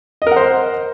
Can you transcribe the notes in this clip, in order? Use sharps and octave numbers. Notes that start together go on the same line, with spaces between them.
A#4 C5 D#5 F#5